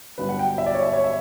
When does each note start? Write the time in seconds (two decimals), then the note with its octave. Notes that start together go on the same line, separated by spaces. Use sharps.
0.18 G1 G2 F#3 B4
0.29 F#5
0.39 G5
0.58 E5
0.66 D5
0.74 C#5
0.83 E5
0.93 C#5
1.04 E5